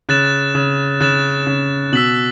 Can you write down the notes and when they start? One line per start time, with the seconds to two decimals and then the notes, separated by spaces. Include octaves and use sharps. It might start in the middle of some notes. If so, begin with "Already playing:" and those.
0.09 C#3 F#6 A6 E7
0.55 C#3
1.00 C#3 F#6 A6 E7
1.47 C#3
1.93 B2 E6 B6 F#7